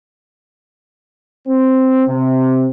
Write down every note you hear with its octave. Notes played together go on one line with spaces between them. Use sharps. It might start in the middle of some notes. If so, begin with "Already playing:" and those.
C4
C3